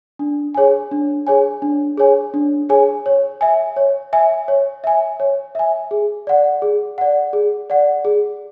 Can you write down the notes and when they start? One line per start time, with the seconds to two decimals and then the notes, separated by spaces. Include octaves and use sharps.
0.19 D4
0.55 G#4 C#5 G#5
0.91 D4
1.27 G#4 C#5 G#5
1.62 D4
1.98 G#4 C#5 G#5
2.34 D4
2.69 G#4 C#5 G#5
3.06 C#5
3.41 E5 G#5
3.76 C#5
4.13 E5 G#5
4.48 C#5
4.84 E5 G#5
5.20 C#5
5.55 E5 G#5
5.91 G#4
6.27 D5 F#5
6.62 G#4
6.98 D5 F#5
7.33 G#4
7.70 D5 F#5
8.05 G#4